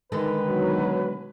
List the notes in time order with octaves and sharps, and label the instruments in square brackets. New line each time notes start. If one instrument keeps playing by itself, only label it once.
[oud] D3 G#3 A4 [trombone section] D#3 [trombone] B4
[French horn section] B2 F#3